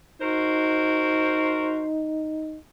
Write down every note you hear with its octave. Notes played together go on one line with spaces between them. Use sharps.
D#4 F#4 A#4 C5